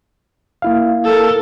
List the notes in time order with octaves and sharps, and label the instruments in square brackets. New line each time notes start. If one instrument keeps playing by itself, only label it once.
[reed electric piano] A#3 E4 F5
[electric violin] A4 A#4